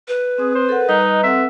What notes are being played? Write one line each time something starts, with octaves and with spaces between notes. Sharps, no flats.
B4
C4 G#4 D#6
C5
A4 A#4 F#5
G3 D#4 D#5 A#5
C4 A4 E5 F#5